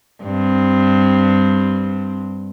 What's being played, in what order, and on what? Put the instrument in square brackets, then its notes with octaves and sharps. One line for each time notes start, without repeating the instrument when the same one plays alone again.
[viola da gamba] G2 C4